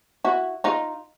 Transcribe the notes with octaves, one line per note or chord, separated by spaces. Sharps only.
E4 F#4
D#4 F4